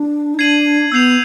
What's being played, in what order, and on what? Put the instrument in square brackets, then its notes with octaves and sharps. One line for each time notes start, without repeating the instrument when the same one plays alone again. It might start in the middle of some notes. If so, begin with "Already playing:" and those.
Already playing: [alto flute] D4
D#4
[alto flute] D4 [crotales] G#6 C7 D#7 F#7
[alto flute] B3 [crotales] E6 G6 C7 F7